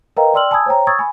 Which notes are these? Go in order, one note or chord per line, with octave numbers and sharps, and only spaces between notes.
A#4 B4 D#5 F5 G5 A#5
D5 G5 C6 E6 F6 F#7
G#5 A5 B5 D#6 E6 G#6
C5 C#5 G5 A#5
C#6 D#6 E6 G#6 A6
G#5 B5